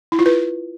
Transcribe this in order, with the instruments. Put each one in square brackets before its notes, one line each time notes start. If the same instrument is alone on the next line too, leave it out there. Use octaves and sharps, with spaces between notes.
[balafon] E4
F4
B4